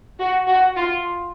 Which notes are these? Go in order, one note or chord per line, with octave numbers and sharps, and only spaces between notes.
F#4
F#4
F4